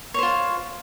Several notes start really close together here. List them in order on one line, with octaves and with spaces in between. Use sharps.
C#5 C5 F4